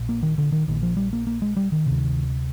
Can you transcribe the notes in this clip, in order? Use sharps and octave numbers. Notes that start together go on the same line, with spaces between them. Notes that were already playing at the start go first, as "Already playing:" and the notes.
Already playing: A#1 A#2
A#3
D#3
D3
D#3
A#1 A#2 D#3
F3
G3
A#3
A#3
G#3
G3
D#3
D2 C3